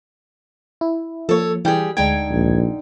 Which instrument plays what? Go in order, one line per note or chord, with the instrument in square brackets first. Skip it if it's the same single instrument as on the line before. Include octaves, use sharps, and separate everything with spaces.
[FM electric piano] E4
[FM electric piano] F3 A#3 [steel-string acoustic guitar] A4 C#5
[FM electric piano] E3 G5 [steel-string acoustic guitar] G3 G4 G#4
[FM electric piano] D2 G#3 G#6 [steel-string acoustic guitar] D3 D#4 G5
[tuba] A#1